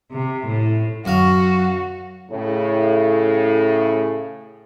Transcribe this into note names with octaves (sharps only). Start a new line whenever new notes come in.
C3
A2
F#2 F#4 F5
A2 C#3